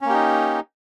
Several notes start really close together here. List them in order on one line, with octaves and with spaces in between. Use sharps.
C#4 A#3 G4 D#4